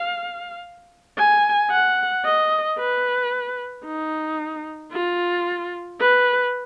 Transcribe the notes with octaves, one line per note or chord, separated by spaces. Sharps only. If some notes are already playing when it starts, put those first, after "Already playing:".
Already playing: F5
G#5
F#5
D#5
B4
D#4
F4
B4